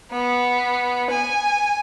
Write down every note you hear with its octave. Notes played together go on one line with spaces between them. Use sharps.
B3
G#5